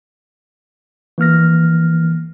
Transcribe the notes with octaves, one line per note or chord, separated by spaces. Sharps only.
E3 A#3 F6 A#6